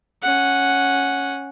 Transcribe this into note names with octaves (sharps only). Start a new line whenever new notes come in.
C#4 F#5